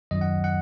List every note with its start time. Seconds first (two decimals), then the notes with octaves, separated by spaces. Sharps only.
0.11 F#2 D#3 F#3 D#5
0.21 F#5
0.44 F#5